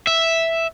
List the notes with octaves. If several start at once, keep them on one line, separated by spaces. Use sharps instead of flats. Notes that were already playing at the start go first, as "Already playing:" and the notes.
E5